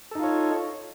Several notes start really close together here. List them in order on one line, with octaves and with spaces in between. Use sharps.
A4 D#4 F4 C#5